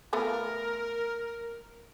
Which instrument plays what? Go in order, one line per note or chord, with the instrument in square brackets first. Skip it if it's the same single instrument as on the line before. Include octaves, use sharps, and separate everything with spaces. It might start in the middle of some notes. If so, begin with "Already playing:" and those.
[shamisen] A3 B3 F4 [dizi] A#4